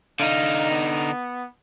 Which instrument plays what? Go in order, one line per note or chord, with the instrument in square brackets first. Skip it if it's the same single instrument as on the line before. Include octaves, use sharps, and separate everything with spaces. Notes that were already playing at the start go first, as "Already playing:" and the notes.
[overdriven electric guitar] D3 D#4 [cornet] F5
[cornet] B3